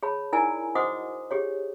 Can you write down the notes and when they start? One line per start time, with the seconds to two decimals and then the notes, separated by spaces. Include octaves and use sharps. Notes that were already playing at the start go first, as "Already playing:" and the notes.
0.03 G#4 C#5 A5 B5
0.32 D#4 E4 A#4 D5 G#5 A#5
0.75 F#4 C5 D#5 F#5 D6 D#6
1.31 G4 G#4 C#5